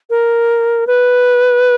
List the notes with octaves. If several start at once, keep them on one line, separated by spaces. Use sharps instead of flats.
A#4
B4